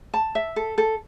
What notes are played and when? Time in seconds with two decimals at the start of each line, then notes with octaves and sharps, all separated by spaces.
0.14 A5
0.35 E5
0.56 A4
0.78 A4